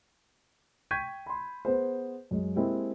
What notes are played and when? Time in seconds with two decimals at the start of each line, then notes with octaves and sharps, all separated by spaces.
0.91 G5 C#6 G6 G#6 B6 D#7
1.26 B5 C6
1.65 B3 G#4 C5
2.31 F#2 G#3
2.56 G#3 A#3 C4 E4 G4